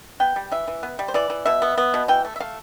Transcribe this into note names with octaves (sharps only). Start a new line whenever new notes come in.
B3 G5
G3
E3 E5
E3
B3
G3
C5
E3 D5
E3
B2 E5
B3
B3
B2
E3 G5
A3
E5
A3 F5